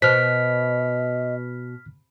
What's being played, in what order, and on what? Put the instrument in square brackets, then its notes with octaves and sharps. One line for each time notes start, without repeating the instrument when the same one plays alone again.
[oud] B2 [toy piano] C5 [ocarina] D#5 [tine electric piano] F6 B6